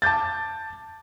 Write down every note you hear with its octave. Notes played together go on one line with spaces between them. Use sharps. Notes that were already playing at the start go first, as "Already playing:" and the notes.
A5 D6 G6 A6